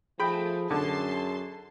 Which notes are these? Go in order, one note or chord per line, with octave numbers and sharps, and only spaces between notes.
F3 A3 G#4 G5 B5
F#2 D3 A5 C6